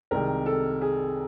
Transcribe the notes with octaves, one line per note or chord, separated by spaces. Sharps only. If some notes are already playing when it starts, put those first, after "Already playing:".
C2 C3 D#3 G#3 A#4
A4
G#4